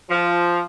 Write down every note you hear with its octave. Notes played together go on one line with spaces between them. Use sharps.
F3